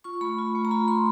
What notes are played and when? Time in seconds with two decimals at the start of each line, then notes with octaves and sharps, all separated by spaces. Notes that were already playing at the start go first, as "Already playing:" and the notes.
0.04 F4 C#6
0.21 A3 B5
0.38 F4
0.55 A3
0.65 A#5
0.71 F4 B5
0.88 A3 C6